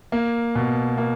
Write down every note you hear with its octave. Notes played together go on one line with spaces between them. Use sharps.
A#3
B2
A#3